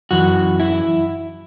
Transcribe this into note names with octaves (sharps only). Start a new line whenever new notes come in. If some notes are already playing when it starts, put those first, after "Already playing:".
F#2 E3 F#4
E4